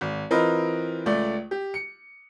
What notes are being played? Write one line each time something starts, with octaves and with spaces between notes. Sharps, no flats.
G#1
E3 C4 F4 A#4 B4 D#5
C#2 A3 D5
G4
C#7